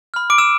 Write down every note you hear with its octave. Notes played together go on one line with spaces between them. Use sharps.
B5 F6
D6 D7
E6 E7